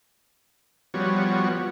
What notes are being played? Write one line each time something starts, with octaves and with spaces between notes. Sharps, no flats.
F3 G3 B3 F#4 C#5